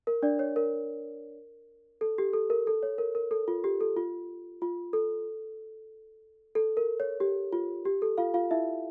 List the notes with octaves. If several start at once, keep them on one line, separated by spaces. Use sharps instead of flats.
A#4
D4 D5
C#5
A#4
A4
G4
A4
A#4
A4
C#5
A#4
A#4
A4
F4
G4
A4
F4
F4
A4
A4
A#4
C#5
G4
F4
G4
A4
F4 F5
F4 F5
E4 E5